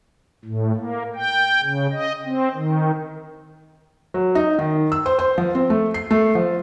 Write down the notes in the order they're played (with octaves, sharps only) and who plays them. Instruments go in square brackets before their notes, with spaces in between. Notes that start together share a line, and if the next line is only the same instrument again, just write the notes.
[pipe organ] A2
A#3
G5
C#3
D#5
C4
D#3
[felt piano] F#3
D#4
D#3
E6
C5
C5
F3
C4
A3
C7
A3
F3